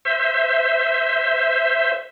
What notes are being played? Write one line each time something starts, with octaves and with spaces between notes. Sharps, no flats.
C5 E5